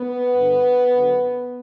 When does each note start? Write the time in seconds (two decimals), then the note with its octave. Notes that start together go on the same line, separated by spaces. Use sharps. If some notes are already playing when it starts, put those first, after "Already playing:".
Already playing: B3
0.35 G2 D3
0.94 F#2 D3